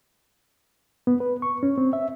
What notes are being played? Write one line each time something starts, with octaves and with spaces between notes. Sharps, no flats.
B3
B4
C#6
C#4
C4
E5